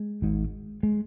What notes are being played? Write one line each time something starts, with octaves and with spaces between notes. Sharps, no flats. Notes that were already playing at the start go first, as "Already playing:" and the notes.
Already playing: G#3
G#1 G#2
G#3